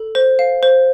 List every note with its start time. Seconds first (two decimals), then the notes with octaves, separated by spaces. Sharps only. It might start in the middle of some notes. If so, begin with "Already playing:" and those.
Already playing: A4
0.15 C5
0.39 F5
0.63 C5